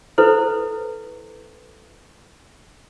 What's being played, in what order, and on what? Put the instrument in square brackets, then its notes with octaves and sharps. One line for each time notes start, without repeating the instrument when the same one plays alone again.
[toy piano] E4 A4 B4 C5